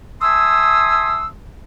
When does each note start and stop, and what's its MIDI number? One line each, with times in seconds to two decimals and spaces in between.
0.22 1.27 76
0.22 1.27 80
0.22 1.27 81
0.22 1.27 84
0.22 1.27 87
0.22 1.27 88